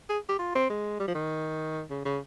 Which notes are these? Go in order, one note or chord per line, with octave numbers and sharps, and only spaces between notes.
G#4
G4
F4
C4
G#3
G3
F3
D#3
C#3
C#3